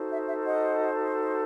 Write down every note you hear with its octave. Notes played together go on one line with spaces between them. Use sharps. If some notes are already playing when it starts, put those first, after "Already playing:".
Already playing: D#4 F#4 A4 C5
E5
E5
D#5 F#5